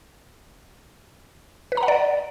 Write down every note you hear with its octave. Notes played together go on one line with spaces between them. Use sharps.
B4
A#5
F#5
D5